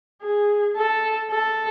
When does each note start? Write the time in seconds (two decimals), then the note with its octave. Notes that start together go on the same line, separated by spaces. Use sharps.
0.22 G#4
0.76 A4
1.31 A4